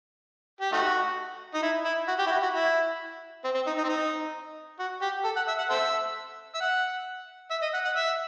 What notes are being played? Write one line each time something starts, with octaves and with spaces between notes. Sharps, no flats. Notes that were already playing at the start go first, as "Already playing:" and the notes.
G4
A3 D#4 F#4
D#4
E4
E4
F#4
G4
E4
F#4
F#4
E4
C4
C4
D#4
D#4
C4
D#4
F#4
G4
A4
F#5
E5
F#5
A4 C5 E5
E5
F#5
E5
D#5
F#5
F#5
E5